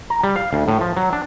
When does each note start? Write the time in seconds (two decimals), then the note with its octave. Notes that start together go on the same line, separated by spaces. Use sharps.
0.10 A#5
0.23 G3
0.36 F5
0.53 D2
0.68 A2
0.81 F3
0.97 F#3
1.13 D4